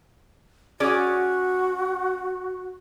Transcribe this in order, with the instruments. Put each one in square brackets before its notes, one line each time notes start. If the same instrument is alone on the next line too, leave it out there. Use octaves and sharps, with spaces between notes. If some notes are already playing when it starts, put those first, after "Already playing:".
[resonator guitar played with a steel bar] C#4 G#4 D5 [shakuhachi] F#4